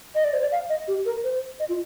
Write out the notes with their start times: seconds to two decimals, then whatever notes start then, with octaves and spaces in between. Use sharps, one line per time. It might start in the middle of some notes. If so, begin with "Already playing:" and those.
0.15 D#5
0.24 D5
0.33 C5
0.41 D5
0.52 F5
0.69 D#5
0.88 G4
1.05 A#4
1.23 C5
1.60 D#5
1.69 F4